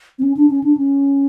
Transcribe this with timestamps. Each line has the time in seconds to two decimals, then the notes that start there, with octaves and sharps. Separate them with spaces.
0.19 C4
0.23 C#4
0.37 D4
0.50 C#4
0.64 D4
0.77 C#4